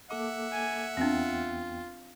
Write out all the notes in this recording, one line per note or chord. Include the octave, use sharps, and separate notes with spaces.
A#3 A4 E5 F#5 D6
G#5
E2 B3 C4 D4 F4 G5